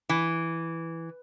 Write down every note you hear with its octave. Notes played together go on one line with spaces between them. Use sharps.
E3